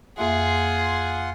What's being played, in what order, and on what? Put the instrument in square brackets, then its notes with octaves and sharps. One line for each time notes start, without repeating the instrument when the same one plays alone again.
[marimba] F2 A#3 E5 [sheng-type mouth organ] F4 F#5 C6 [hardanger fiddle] G#4